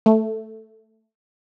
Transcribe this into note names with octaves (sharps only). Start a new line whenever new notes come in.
A3